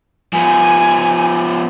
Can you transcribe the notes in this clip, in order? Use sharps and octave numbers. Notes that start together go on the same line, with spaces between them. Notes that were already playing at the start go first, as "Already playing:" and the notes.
F3 B3 G#5